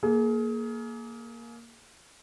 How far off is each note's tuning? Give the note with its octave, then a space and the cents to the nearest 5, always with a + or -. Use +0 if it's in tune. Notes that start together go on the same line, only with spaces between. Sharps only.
A#3 +0 G#4 +30